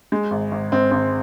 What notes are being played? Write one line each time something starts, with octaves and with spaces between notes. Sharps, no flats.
G#3
G#1
G#1
G#1 C4
G#1 C4